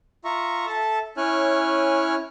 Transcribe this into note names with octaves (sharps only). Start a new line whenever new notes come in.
F4 E5 A#5 C#6
A4 E5 A5
C#4 E4 C#5 G#5 F6 F#6